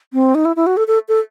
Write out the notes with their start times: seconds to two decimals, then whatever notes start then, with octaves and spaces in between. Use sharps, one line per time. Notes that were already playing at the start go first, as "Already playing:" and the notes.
0.13 C4
0.35 D#4
0.45 E4
0.56 E4
0.66 F#4
0.77 A4
0.88 A4
1.09 A4